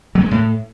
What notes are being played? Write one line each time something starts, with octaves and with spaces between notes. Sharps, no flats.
F#3
A#3
G#3
A2